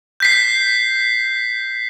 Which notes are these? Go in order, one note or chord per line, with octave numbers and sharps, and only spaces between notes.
G6 B6 C7